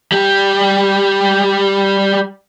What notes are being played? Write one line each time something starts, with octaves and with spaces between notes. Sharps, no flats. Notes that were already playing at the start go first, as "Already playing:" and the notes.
G3 G4